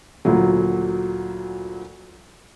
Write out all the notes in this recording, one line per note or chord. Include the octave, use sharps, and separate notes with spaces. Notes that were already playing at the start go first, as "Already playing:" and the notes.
D2 A#2 F#3